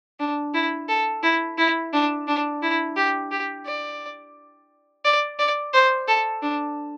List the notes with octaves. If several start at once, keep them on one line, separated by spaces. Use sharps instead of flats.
D4
E4
A4
E4
E4
D4
D4
E4
G4
G4
D5
D5
D5
C5
A4
D4